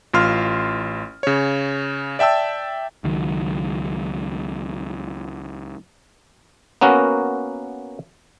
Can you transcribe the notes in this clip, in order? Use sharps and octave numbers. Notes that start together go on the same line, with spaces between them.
A1 F4 C6 F6
C#3 C#5
D5 E5 G5 A5 E6
C#2 D#3 F#3
A#3 B3 C#4 F#4 A#4